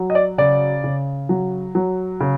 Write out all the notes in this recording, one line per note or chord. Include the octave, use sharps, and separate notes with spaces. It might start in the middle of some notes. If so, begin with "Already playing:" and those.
Already playing: F#3
D#5
D5
C#3 D5
C#3
F#3
F#3
C#3